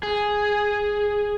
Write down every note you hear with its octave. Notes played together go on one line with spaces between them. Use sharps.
G#4